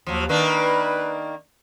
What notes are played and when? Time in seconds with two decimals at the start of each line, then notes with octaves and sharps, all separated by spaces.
0.07 D#2 F3 F#3
0.29 D#3 A#3 D4 B4